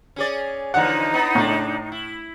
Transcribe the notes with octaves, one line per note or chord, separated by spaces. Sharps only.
C#4 G#4 D5
D3 E3 F3 D#4 F#5 A#5
B3 E4
A2 C#3 D4
E4